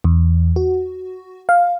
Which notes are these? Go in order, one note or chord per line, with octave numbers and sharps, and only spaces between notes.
E2
F#4
F5